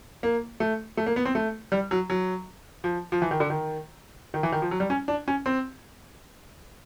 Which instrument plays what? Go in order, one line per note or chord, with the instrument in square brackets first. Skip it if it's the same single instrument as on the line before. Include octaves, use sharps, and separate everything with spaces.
[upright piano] A#3
A3
A3
A#3
B3
C4
A3
G3
F#3
F#3
F3
F3
E3
D#3
D3
D#3
D#3
E3
D#3
F3
F#3
G3
C#4
D4
C#4
C4